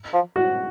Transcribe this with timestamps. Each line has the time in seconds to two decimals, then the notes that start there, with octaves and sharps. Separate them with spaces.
0.13 F3
0.36 F#4